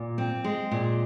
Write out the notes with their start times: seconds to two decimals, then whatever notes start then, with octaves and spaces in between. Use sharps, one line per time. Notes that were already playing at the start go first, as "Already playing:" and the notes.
Already playing: A#2
0.18 C4
0.44 G#3
0.71 A#2